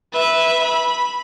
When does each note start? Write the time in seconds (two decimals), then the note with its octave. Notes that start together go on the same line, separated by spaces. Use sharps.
0.13 B4 E5
0.64 B5